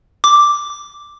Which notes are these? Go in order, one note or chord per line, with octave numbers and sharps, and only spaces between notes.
D6